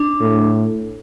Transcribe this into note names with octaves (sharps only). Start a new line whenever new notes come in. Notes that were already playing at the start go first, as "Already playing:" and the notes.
Already playing: D4
A2